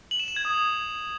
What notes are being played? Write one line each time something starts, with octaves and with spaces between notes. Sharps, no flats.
F#7
E7
F#7
G#6
D#6